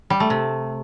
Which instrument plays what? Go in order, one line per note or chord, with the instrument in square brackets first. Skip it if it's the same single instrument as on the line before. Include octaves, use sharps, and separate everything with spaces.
[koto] G3
A3
C3